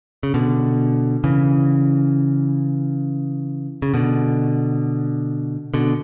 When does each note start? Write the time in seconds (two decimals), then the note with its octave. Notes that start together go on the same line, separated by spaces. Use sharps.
0.23 C#3
0.34 B2 D3
1.24 C#3 E3
3.82 C#3
3.94 B2 D3
5.74 B2 D3